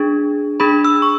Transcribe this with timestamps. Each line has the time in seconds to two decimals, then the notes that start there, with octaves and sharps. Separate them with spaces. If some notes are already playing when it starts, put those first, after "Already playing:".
Already playing: D4 G#4
0.60 D4 G#4 B5
0.85 E6
1.02 C#6